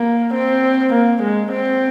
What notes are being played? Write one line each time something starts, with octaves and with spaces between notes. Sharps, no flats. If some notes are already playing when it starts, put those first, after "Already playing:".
Already playing: A#3
C4
A#3
G#3
C4